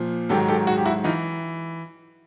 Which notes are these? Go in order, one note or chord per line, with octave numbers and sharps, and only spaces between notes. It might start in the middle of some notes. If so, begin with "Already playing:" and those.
Already playing: A#2 F3
G#2 D#3 F#3 G4 A4
G4 A4
F#4 G#4
G4
E4 F#4
E3 D#4 F4